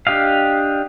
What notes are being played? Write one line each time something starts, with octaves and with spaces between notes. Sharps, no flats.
D4 G4 D#5 F5